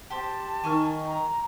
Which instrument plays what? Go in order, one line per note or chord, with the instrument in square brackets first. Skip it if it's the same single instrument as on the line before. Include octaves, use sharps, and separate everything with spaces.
[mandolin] G4 C5 [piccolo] A5
[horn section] D#3 [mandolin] G#5 C#6 F6
[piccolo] A#5